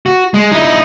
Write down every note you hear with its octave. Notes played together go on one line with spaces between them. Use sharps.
F#4
G#3
D#4 E4